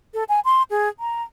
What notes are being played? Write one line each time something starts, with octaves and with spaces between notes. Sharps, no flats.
A4
G#5
C6
G#4
A#5